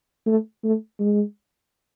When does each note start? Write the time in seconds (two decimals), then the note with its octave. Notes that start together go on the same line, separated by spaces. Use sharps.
0.26 A3
0.64 A3
1.00 G#3